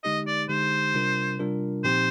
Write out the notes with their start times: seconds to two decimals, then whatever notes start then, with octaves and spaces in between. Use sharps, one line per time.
0.04 D3 G#3 D#4 G4 D#5
0.27 D5
0.49 D3 G#3 D#4 G4 C5
0.94 C3 G3 D4 F4 A#4
1.39 C3 G3 D4 F4 A#4
1.85 A#2 F3 C4 D#4 G4 C5